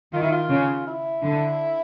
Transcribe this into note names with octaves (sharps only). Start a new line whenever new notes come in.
D#3 F4
E4
F4
C#3
E4
D3